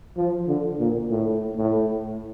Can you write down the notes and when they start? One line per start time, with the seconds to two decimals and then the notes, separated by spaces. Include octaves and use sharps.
0.17 F3
0.48 D3
0.79 A#2
1.11 A2
1.57 A2